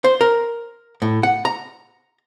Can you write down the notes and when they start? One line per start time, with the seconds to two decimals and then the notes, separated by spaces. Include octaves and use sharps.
0.04 C5
0.21 A#4
1.02 A2
1.23 F#5
1.45 A#5